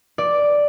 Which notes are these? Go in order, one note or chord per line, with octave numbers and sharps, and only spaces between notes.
D5